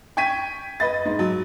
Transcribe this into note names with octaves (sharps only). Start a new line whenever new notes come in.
G5 C#6 G#6 B6 D#7
B4 D#5 A6
G#2
F#3